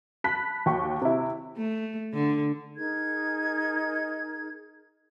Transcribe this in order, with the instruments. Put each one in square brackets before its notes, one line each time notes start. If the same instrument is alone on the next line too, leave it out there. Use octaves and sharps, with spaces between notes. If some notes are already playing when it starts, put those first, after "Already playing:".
[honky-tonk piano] A5 B5 F#6 B6
D#2 F#4 G5 C#6
C3 E4
[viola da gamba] A3
D3
[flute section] D#4 G#4 A#4 G#6